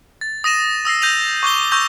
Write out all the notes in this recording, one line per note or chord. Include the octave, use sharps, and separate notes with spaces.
A6
D#6 A#6 D#7 E7
D#6 E6 A#6 C7
G6 A#6 D#7 F7
C#6 D6 G6 G7
C#6 E6 G6 A#6 F7